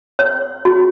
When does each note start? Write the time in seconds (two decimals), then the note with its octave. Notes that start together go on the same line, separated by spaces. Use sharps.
0.19 C#5
0.65 F#4